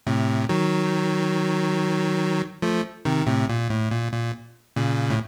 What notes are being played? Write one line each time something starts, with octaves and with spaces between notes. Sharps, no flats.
A2 C3
D#3 F#3
F3 A3
C3 D#3
A2 C3
A#2
A2
A#2
A#2
A#2 C#3
A2